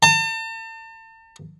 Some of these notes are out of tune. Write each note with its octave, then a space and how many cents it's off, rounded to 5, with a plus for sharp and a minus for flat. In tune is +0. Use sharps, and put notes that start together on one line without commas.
A5 +40